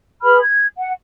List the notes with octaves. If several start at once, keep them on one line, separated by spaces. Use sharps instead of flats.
G#4 B4 B5 F6
G#6
F#5